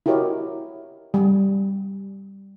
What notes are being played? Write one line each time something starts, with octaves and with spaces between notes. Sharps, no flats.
E4 F#4 G4 A#4 C#5 D#5
G3